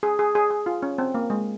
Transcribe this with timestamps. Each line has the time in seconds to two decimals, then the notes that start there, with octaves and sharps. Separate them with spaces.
0.03 G#4
0.19 G#4
0.35 G#4
0.51 G#4
0.66 F4
0.82 C#4
0.98 C4
1.14 A#3
1.30 G#3